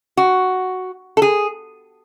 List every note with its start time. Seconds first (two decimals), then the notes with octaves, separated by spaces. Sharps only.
0.17 F#4
1.17 A4
1.22 G#4